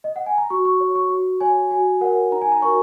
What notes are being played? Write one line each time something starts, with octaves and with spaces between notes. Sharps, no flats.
D#5
F#5
G#5
A#5
F#4 C#6
C#6
C#5
C#6
F#4
C#5 G#5
F#4 G#5
A#4 C#5 F#5
D#4 A#5
G#5
A#5
F#4 A#4 C#5 C#6